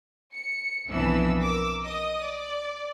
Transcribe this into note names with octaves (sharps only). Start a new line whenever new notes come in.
C#7
B1 F2 E3 B3 D4 E6
A#4 D6 E6
D#5 D#6
D5